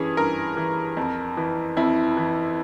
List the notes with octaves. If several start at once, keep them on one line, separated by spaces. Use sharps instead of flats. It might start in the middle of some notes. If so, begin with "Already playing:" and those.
Already playing: G2 E3 C#4 G#4
G2 A#4
E3
F2
E3
F2 E4
E3